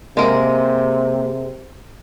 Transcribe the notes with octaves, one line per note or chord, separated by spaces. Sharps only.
C3 G#3 A#3 A#4